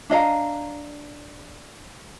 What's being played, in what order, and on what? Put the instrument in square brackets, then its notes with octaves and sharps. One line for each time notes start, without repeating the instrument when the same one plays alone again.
[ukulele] D4 D#5 F5 A#5